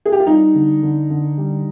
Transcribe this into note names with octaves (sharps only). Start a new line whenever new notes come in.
G#4
G4
F4
G3 D#4
D3
D3
D3
G3